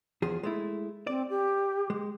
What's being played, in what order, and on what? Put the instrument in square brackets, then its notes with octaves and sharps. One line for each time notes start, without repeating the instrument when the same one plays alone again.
[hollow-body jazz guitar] E2 F3 G#4
G#3 A3 E4
[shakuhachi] C4 [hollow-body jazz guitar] D5
[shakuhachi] G4
[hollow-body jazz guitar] G#3